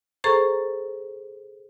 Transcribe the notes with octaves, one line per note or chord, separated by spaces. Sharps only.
G#4 A4 C5 A#5 C#6